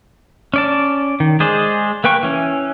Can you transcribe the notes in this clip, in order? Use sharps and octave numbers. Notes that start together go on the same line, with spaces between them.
C#4 D5 A5
D#3
G#3 G#4 C5 D5
A#3 B4 G5 C#6
E3 C#4